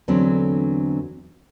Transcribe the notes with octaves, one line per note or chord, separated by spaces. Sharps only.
E2 D3 F#3 A3 C4 D4